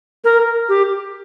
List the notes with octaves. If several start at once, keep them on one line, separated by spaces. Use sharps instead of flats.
A#4
G4